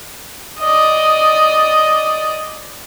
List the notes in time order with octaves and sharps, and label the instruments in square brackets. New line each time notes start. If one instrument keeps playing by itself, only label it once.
[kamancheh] D5 D#5